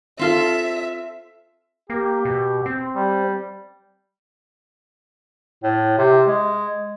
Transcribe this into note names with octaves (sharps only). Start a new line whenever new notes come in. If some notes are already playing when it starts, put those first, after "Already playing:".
C4 F4 A4 E5
A#3 G4
B2
C4
G3
A2
C3
G#3